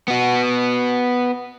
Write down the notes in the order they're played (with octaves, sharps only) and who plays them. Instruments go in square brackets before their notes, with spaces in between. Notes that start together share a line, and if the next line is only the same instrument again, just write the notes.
[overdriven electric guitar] B3 F#4